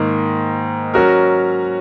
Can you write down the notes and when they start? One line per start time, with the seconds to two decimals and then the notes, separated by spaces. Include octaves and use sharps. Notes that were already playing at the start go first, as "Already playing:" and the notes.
Already playing: G#2 D#3 A#3
0.94 F#3 C#4 F#4 A#4